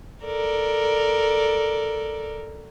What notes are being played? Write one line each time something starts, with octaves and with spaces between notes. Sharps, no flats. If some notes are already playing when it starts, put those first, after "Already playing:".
A4 A#4 D5